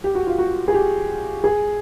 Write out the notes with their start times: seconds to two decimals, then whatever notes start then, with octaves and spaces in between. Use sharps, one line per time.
0.04 G4
0.15 F#4
0.26 F4
0.38 F#4
0.68 G#4
0.74 G4
1.44 G#4